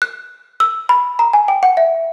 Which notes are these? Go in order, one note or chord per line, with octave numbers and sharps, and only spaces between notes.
F#6
E6
B5
A#5
G#5
G5
F#5
E5